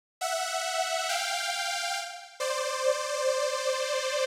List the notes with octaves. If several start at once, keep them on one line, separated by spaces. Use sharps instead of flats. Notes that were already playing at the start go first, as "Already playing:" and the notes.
E5 F#5
F5 G5
C5 D5